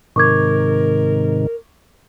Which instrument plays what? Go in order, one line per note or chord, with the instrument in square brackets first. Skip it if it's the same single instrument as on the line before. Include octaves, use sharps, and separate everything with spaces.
[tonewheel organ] G#2 C3 D#3 [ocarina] A#4 [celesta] C#6 D6 G#6